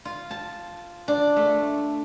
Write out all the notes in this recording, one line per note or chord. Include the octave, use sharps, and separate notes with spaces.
F4
A5
D4
A3